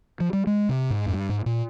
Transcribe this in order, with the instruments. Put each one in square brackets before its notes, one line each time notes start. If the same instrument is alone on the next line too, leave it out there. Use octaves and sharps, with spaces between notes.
[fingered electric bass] F3
G3
G#3
C3
G#2
F2
G2
G#2
A#2